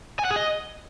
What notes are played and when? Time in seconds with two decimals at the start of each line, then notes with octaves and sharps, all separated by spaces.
0.19 G#5
0.25 F#5
0.30 G#4
0.36 D#5